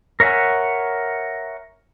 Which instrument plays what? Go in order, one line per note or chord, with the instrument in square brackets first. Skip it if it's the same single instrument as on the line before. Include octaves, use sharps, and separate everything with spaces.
[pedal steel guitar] A#4 C#5 E5 F#5 G#5